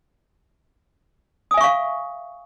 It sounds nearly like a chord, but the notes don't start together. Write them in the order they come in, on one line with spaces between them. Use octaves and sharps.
D#6 G#5 E5 C#6 F5